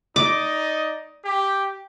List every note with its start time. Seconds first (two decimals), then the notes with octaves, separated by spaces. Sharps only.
0.16 D#4 D5 D#5 D6
1.25 G4 G5